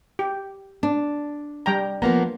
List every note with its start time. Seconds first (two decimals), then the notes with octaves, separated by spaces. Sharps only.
0.19 G4
0.83 D4
1.66 G3 G5 A#5
2.02 F3 A#3 B3 A#5